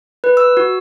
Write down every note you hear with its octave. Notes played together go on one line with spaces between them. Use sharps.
B4
E6
F#4